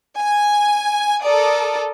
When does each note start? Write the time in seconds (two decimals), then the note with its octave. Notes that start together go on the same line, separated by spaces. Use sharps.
0.20 G#5
1.22 A4 A#4 D5 D#6